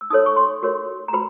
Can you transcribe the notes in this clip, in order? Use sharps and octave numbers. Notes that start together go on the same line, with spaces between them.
E6
D#4 F#4 A4 C#5 D#6
C#6
C6
F#4 A#4 C#5
A#5
F#4 B4 B5